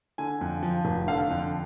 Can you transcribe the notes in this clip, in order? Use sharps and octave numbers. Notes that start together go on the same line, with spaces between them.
D3 G#5
F2
F3
F1
D3 F5
F2